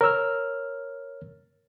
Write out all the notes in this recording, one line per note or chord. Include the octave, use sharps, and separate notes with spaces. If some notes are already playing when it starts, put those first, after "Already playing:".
A#4 C#5 E6 F6